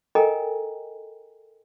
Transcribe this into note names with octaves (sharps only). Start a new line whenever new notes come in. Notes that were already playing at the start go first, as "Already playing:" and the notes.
A4 A#4 D#5 G5 G#5 A#5